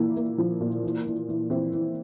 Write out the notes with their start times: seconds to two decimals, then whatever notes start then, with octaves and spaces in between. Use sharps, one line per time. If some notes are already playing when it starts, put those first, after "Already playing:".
Already playing: A#2 E3 A#3 E4
0.17 A#3
0.38 F3
0.61 A#2
0.84 E3
1.06 E3
1.29 E3
1.50 E3 C4 E4
1.73 E3